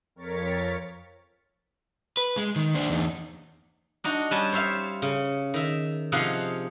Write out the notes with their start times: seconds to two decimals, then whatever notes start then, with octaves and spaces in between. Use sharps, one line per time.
0.15 F2 A#4 C#5 A6 B6 C#7
2.17 B4
2.37 G#3
2.56 D#3
2.75 D4 C5
2.90 E2 D#4
4.04 D4 D#4 F#4
4.31 G3 C#4 G#5 A5
4.52 C5 C#5 E5 F5
5.02 C#3
5.54 D#3 E5
6.12 C3 F3 D#4 G#4 F5 F#5